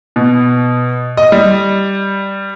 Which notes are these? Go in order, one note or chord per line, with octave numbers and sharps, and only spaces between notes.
B2
D#5
G3